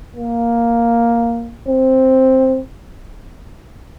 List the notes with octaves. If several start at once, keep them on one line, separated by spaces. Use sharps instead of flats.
A#3
C4